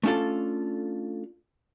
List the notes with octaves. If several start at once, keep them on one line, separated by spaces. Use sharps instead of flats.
A3 C#4 D4 F4 A4